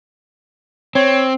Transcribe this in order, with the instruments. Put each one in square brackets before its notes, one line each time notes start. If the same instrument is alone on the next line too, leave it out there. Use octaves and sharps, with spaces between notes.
[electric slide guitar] C4 [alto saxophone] C#5